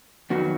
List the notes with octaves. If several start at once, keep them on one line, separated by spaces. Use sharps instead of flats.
F2 D#3 F#3 B3 F#4